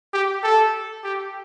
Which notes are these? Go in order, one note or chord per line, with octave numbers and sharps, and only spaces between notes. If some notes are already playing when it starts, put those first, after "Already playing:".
G4
A4
G4